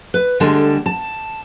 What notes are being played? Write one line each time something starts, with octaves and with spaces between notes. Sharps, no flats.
B4
D2 D3 G3 G#3 A5
A5